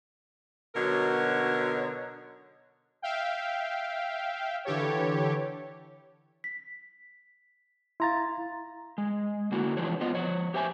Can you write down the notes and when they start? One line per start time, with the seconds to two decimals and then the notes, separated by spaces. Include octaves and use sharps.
0.75 B2 D3 F#3 D#4 A#4 C#5
3.02 E5 F5 G5
4.65 D3 E3 G4 A4 C#5
6.44 B6
8.00 E4 F5 A#5 C6 A6
8.98 G#3
9.52 D3 A#3 E4 F#4
9.77 E3 F3 G#3 D4 C#5
10.01 B3 F4 D#5
10.14 F3 C#5
10.54 G4 C5 C#5 E5 G#5